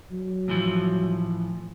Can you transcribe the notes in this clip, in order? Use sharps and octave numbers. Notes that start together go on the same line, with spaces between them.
F#3
A2 E3 F3